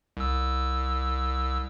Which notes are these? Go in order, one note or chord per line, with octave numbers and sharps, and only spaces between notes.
C2 E6